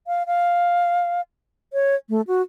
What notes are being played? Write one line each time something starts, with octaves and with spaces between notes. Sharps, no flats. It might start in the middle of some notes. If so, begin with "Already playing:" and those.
F5
F5
C#5
A3
F#4